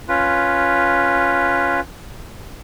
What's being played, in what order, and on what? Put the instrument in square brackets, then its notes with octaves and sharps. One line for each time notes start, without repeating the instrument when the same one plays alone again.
[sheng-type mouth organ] C#4 F4 B4